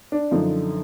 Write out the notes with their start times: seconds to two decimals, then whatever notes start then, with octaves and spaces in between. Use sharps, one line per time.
0.12 D4
0.31 F#2 D3 F3 D#4